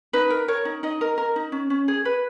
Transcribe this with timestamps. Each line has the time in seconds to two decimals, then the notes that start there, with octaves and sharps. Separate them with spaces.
0.13 D#4 B4
0.30 A#4
0.48 A#4 C#5
0.65 D#4
0.83 D#4 D#5
1.01 A#4
1.18 A#4
1.36 D#4
1.52 C#4
1.70 C#4
1.88 G#4
2.05 B4